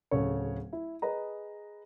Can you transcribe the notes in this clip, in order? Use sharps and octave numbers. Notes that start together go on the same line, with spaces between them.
D1 C#3 A4 C#5
E4
G#4 B4 D#5 A#5